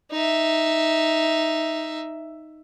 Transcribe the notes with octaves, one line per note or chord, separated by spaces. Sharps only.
D#4 E5